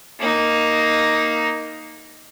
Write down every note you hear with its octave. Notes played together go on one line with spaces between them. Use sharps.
A#3 D#4